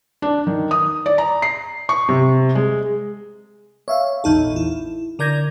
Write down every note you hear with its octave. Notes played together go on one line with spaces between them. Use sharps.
D4
D#3
D#6
D5
A#5
C7
C#6
C3
G#3
C#5 E5 F5
A#1 E2 D#4 A4
E4
D3 A#4 D5 G6 G#6 A#6